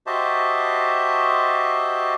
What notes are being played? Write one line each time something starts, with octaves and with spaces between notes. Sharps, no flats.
F#4 G4 C5 D#5 E5 A5